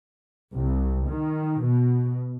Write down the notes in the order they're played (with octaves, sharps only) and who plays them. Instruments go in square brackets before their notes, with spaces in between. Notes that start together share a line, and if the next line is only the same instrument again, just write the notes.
[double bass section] C2
D#3
B2